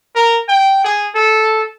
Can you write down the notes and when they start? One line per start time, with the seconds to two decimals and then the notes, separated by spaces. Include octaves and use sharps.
0.15 A#4
0.49 G5
0.84 G#4
1.15 A4